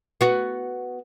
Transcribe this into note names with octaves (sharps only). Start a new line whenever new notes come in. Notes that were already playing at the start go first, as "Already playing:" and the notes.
B3 F#4